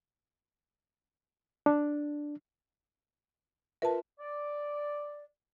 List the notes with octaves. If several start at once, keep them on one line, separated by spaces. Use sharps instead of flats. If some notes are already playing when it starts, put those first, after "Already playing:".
D4
F4 A#4 B4 E5 A5
D5